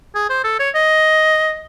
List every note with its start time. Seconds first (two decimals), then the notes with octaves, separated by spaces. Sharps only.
0.15 G#4
0.30 C5
0.44 A4
0.59 C#5
0.75 D#5